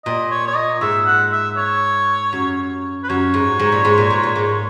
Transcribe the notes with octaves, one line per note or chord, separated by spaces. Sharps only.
A#2 D#5
C#5
C#5
D#5
G#2 E5
F#5
E5
C#5
F#2
B4
F#2 C#5
G#2
G#2
A#2
G#2
A#2
G#2
A#2
G#2